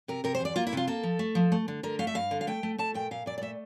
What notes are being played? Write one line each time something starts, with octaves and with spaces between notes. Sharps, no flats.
C3 A#4
C3 A#4
C5
E2 D5
A#3 F4
E4
C3 F4
A#3 A4
F3
A3
F3
A3
D3
D3 A#4
A3 F5
E5
G2 F5
D3
F5
A3 G5
A3
A3 A5
A#2 G5
A#2 F5
A#2 D5
D5
A3 E5